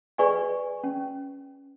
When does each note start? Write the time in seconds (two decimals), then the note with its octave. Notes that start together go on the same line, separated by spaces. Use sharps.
0.18 G#4 B4 D5 G#5 C#6
0.84 C#4